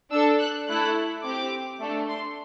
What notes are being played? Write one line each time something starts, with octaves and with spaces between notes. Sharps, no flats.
D4 A4 E6
F#6
A3 E4 A4 F#6
C4 G4 D6
A3 D4 A4
C6